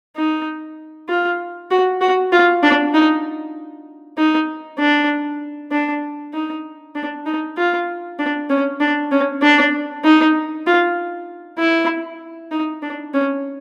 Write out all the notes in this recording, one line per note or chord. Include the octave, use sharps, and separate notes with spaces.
D#4
F4
F#4
F#4
F4
D4
D#4
D#4
D4
D4
D#4
D4
D#4
F4
D4
C#4
D4
C#4
D4
D#4
F4
E4
D#4
D4
C#4